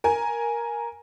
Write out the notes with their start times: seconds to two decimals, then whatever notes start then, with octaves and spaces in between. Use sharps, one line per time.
0.04 A#4 G#5